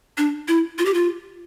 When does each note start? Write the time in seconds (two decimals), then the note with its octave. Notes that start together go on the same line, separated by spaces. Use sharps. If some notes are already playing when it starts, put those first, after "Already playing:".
0.18 D4
0.48 E4
0.78 F4
0.86 G4
0.94 F4